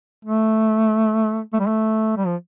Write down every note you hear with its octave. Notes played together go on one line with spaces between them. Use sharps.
A3
A3
G3
A3
G3
F3